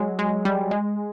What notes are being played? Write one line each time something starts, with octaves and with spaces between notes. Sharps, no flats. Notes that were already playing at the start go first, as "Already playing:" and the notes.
Already playing: F#3 G#3
G#3
G3
G#3